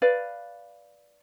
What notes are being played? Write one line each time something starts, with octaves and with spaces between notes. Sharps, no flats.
B4 D5 F5